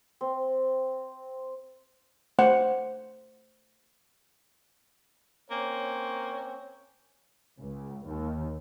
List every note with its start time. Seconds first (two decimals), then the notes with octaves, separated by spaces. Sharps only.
0.21 C4
2.39 A3 C5 F#5
5.51 A#3 C4 C#4 C5 C#5
7.59 C#2
8.07 D#2